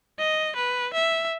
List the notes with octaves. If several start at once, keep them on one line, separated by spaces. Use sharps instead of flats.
D#5
B4
E5